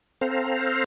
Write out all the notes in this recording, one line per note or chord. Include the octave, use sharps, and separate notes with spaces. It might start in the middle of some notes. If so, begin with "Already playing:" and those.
C4 A4 C5 F5 A#5